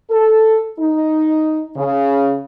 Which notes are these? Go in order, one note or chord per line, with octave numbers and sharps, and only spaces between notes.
A4
D#4
C#3